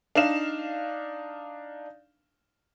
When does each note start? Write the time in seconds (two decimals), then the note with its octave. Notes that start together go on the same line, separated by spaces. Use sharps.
0.15 D4 D#4 F5 E7